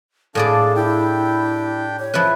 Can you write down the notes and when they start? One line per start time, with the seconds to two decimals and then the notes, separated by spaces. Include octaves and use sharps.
0.35 A2 D4 G#4 A4 D5 F5
0.76 D4 E4 G4 G5
1.99 C#5
2.14 F3 E4 B4